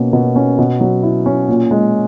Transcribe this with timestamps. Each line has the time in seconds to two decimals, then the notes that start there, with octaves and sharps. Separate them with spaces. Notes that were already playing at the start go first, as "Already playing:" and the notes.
Already playing: B2 A#3 C#4
0.13 B2
0.36 C#4
0.58 B2
0.81 F#3
1.03 E4
1.26 C#4
1.48 A#2
1.71 G#3